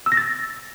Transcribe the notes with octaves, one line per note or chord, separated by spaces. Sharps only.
E6
A#6
A6